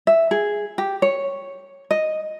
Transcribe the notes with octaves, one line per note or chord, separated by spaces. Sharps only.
E5
G#4
G4
C#5
D#5